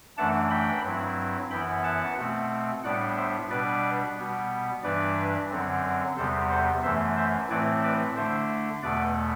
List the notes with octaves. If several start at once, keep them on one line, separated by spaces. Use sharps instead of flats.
F#2 E3 A3 D4 F#5 A5
G5 B5
G2 F#3 C4 E4
F#2 E3 B3 E4 G5 B5
F#5 A5
B2 A3 C4
A2 G3 B3 D4 D5 F#5
C5 E5
B2 G3 D4 B4 D5
B2 G3 B3
G2 E3 G3 D4 B4 D5
F#2 D3 F#3 C4
E2 C3 G3 B3 A4 C5
A4 C5
F#2 E3 A3 C5 E5
C5 E5
A2 E3 A3 C4 E4 B4 D5
B4 D5
D3 A3 D4 C5 E5
E2 B2 A3 B4 D5